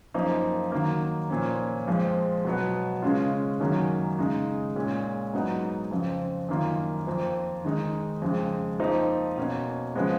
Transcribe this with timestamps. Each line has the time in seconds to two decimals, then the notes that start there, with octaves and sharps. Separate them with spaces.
0.14 F#2 F3 A#3 D#4
0.72 D#3 F#3 A#3
1.30 A#2 F3 A#3 C#4
1.88 F2 F3 G#3
2.45 B2 F#3 B3
3.02 C#3 G#3 C#4 F4
3.60 F#2 D#3 F#3 A#3 C#4
4.18 C#3 G#3 D#4
4.76 A#2 G#3 C#4
5.34 G#2 F#3 B3 D#4
5.91 F2 C#3 F3
6.49 F#2 D#3 A#3 F4
7.07 F2 F3 A#3
7.65 D#3 G#3 D#4
8.22 F2 C#3 G#3
8.80 F2 F3 A#3 D#4
9.37 B2 A#3 C#4
9.95 C#3 F3 G#3 B3